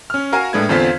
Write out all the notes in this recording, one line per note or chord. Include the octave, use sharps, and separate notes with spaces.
C#4 F6
F#4 A#4 F5 G#5 A#5
A2 G#3 A#3 D4 B4 G#6
E2 D3 C4 F4 F5 B6